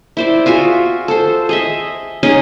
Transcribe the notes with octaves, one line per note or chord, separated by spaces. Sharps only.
E4 C5 D5
F4 F#4 G#4 E5
A4 C5
G#4 D#5 E5
C#4 D#4 G#4 D#5